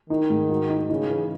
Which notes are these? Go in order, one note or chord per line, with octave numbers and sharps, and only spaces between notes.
D#3 D#4
G#2
F#4
D#4
C#3 D#4
E3